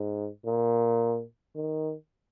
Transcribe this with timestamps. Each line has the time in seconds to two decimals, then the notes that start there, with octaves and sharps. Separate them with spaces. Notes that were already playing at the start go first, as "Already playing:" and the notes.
Already playing: G#2
0.46 A#2
1.55 D#3